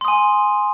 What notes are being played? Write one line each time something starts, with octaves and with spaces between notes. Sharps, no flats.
G#5 C6 D#6